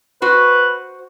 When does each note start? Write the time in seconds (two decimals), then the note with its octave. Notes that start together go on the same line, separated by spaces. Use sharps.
0.22 F#4 B4 C5